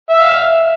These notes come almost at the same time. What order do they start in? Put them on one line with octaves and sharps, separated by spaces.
E5 E6 F5